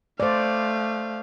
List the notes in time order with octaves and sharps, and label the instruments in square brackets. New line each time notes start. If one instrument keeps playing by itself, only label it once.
[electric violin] A3 F5 [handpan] C5 D5